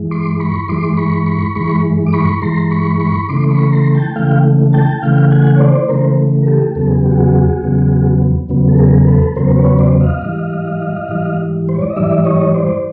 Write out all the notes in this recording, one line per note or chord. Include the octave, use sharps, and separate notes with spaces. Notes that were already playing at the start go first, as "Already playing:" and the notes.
Already playing: G2 E3 G#3
C6 D6
B5 C#6
G2 E3 G#3 C6 D6
B5 C#6
B5 C#6
G2 E3 G#3 B5 C#6
D6
B5 C#6
G2 E3 G#3 A#5 C6
B5 C#6
B5 C#6
C#3 E3 A3 C6 D6
B5 C#6
A#5 C6
G5 A5
C#3 E3 A3 F5 G5
G5 A5
C#3 E3 A3 F5 G5
F#5 G#5
C#5
C5 D5
C#3 E3 A3 A#4 C5
A#4
G4 A4
E2 C#3 F#3 B3 A4
G#4
G4
F#4 G#4
E2 C#3 F#3 B3
E2 C#3 F#3 B3
A4
G#4 A#4
A4 B4
E2 C#3 F#3 B3 A#4 C5
B4 C#5
C5 D5
D#5 F5
G#2 E3 G3
G#2 E3 G3
C5
C#5
D5
D#5
G#2 E3 G3 D5 E5
C#5 D#5
C5 D5